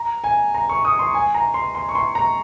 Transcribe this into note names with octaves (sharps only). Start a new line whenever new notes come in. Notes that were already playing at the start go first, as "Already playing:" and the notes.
Already playing: A#5
G#5
A#5
C#6
D#6
C6
G#5
A#5
C6
C6
C#6
C6
A#5